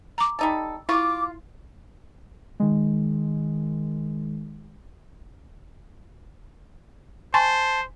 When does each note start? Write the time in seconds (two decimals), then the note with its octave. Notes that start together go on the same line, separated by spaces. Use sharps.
0.18 A#5 D6
0.39 G3 D#4 A4
0.89 E4 F4 C#6 D6
2.60 D#3 G#3
7.34 C5 G#5 A5 C6 C#6